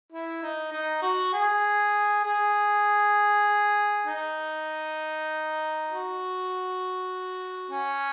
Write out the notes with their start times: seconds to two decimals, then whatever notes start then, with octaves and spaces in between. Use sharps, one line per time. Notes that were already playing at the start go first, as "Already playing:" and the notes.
0.13 E4
0.43 D#4
0.72 D#4
1.02 F#4
1.34 G#4
2.24 G#4
4.07 D#4
5.89 F#4
7.71 C#4